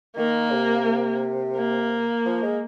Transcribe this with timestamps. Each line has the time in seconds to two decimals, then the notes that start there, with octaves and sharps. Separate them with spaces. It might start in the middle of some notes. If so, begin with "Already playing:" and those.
0.17 D#3 A#3
0.52 C3
1.56 A#3
2.26 F3
2.43 G#3